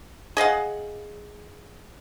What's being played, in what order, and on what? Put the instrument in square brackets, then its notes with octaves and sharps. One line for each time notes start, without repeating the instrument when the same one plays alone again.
[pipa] G#4 D#5 F5 F#5